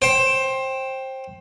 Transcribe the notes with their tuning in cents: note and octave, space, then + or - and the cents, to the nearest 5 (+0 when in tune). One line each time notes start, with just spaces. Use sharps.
C5 +20 G5 +0